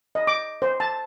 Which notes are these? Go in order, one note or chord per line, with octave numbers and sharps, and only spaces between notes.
D#5
D6
C5
A5